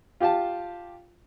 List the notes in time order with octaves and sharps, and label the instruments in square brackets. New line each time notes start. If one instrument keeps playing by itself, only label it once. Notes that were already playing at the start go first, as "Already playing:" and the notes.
[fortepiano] F4 G4 F5 A5